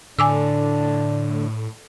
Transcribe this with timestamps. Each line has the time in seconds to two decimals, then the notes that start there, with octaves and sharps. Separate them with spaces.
0.19 A2 D3 D4 G#5 D6 E6